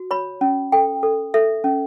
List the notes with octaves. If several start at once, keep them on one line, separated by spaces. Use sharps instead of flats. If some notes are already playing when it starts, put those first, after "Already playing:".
Already playing: F#4
C#5 B5
C#4
A4 G5
A4
A4 E5
C#4